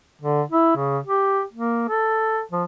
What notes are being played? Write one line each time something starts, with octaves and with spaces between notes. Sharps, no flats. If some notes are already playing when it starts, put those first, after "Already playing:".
D3
E4
C#3
G4
A#3
A4
F3